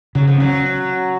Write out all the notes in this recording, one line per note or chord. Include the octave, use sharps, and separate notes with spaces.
C#3 F#3
F3
F#3 C#4